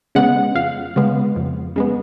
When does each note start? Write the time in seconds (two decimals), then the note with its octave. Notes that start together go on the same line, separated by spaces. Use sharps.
0.15 C#3 G#3 B3 F#5
0.55 F2 F5
0.96 C#3 G#3 B3
1.36 F2
1.76 C#3 G#3 B3